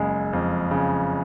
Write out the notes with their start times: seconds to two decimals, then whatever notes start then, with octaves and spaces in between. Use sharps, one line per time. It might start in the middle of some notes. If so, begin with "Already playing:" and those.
Already playing: F#1 C#3 G#3
0.33 F2
0.71 C#3